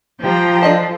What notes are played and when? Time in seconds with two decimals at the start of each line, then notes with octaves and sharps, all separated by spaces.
0.22 F3 G4 G5 A#5
0.63 D4 A4 D#5 A5